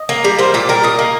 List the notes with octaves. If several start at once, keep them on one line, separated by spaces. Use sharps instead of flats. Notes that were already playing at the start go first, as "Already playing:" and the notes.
Already playing: D#5
A#3
G3
A#3 C5
A#2 G4
G3 A#4
A#2 D#5
A#3